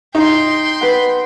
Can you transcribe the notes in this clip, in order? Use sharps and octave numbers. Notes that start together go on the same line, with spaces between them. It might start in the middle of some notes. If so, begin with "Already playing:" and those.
D#4 G5 C6
B4 F#5